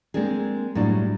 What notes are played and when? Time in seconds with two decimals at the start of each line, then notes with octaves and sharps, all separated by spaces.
0.14 G#3 A#3 C4 D4 G#4
0.75 A2 F#3 G3 D4